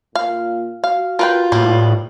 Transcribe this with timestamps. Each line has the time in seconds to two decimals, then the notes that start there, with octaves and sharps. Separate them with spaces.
0.15 A#2 F4 F5
0.84 F#4 F5
1.19 F4 A#4 B4 G5
1.52 A2 G3 A#3 B3